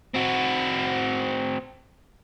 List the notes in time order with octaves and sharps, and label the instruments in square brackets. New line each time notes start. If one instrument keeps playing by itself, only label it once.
[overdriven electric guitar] C4 F#4